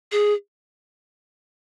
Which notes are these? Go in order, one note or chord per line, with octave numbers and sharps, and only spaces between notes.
G#4